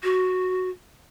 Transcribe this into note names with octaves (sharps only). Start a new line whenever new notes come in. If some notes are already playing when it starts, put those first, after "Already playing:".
F#4